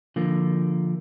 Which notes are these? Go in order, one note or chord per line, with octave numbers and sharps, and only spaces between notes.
D3 F3 A#3